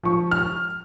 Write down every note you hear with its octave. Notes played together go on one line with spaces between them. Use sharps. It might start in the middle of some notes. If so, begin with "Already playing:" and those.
F3 C#6
F6